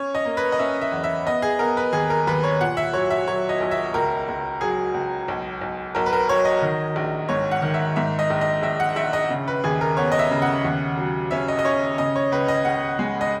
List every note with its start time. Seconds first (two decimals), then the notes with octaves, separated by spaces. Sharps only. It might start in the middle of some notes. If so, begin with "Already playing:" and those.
Already playing: C#4 C#5
0.15 D#5
0.25 A#3
0.37 B4
0.52 D#5
0.59 C#4 E5
0.81 E5
0.92 E2
1.04 E5
1.26 B3 D#5
1.42 G#4
1.59 B3 A#4
1.77 B4
1.93 D#2 G#4
2.10 A#4
2.27 D#2 B4
2.44 C#5
2.61 A#2 F#5
2.77 E5
2.93 F#3 C#5
3.10 E5
3.28 F#3 C#5
3.49 D#5
3.61 B1
3.71 E5
3.94 C#2 A#4
4.28 C#2
4.61 F#3 G#4
4.94 C#2
5.28 B1
5.61 B1
5.95 B1 A#4
6.06 B4
6.13 A#4
6.29 F#3 C#5
6.45 D#5
6.62 D#3
6.96 A#1
7.29 G#2 C#5
7.51 F#5
7.62 D#3
7.74 E5
7.96 G#2 E5
8.19 D#5
8.30 A#1
8.41 D#5
8.63 A#1 E5
8.80 F#5
8.96 A#1 E5
9.13 D#5
9.30 C#3
9.48 B4
9.64 D#2 G#4
9.81 A#4
9.97 B3 C#5
10.12 D#5
10.19 E5
10.31 C#3
10.42 F#5
10.65 D#2
10.98 F#3
11.31 C#4 E5
11.48 D#5
11.59 D#5
11.65 C#4 C#5
11.98 C#3 D#5
12.16 C#5
12.32 C#2 B4
12.48 D#5
12.65 C#2 F#5
12.99 G#3
13.21 D#5